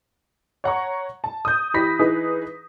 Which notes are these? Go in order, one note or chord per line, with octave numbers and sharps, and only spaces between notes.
C#5 F#5 A#5 C#6
A5
D#6 G6
E3 G4 B5 A#6 B6
E3 D#4 G#4 B4